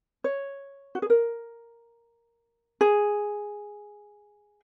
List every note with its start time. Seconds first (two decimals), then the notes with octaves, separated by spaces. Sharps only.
0.24 C#5
0.95 F#4
1.02 G#4
1.10 A#4
2.81 G#4